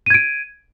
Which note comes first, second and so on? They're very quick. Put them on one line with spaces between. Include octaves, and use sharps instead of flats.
D#7 G#6 D7